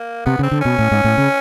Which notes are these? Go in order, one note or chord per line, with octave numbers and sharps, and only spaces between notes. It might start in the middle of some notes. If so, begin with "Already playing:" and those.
Already playing: A#3
C3 B3
C#3
C4
D3
B2 C#4
A2
G#2
A2
C#3